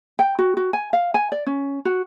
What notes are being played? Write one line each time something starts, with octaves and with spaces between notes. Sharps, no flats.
G5
F#4
F#4
G#5
F5
G#5
D5
C#4
F#4